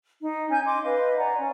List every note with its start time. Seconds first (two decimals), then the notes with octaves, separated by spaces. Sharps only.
0.21 D#4
0.50 C#4 G#5 G6
0.65 D#5 C6 D6
0.84 B4 D#5 F5
1.18 D5 F#5 G#5 A#5
1.37 C#4